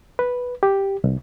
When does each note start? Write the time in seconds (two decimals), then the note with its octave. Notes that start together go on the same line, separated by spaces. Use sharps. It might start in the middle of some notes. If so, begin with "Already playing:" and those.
0.19 B4
0.63 G4
1.04 C2